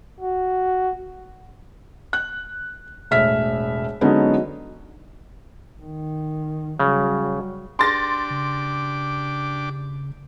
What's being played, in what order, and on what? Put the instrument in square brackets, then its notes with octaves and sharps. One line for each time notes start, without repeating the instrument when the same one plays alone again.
[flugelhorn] F#4
[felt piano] F#6
E1 A2 E5 F6 B6
D3 F#3 G#3 B3 C#4 D#4
[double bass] D#3
[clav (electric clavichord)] C#3 [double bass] F#3 G3
[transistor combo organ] D4 G4 D6 [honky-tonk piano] C6 A6 A#6
[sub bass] C#3